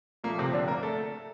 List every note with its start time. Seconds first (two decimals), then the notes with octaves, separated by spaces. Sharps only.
0.24 A#2 F3 A3 A#3
0.38 C3 C4
0.53 D3 D4
0.68 A#3 A#4
0.83 A3 A4